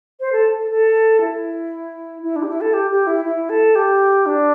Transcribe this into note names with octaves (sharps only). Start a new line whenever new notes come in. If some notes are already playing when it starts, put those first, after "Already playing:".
C5
A4
A4
A4
E4
E4
D4
G4
E4
A4
G4
G4
E4
E4
A4
G4
D4